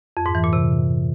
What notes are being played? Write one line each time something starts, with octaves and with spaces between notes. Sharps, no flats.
F2
G#2
E3
A#2
C3